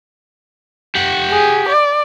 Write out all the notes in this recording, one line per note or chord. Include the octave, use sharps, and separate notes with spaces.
G4 F#5
G#4
D5